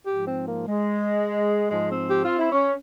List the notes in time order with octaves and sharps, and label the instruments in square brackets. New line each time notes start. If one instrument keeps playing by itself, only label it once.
[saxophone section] G#2 F3 G4
C4
A#3
G#3
G#2 F3 G#3
C4
G4
F4
E4
C#4